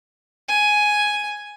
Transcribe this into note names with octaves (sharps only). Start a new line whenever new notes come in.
G#5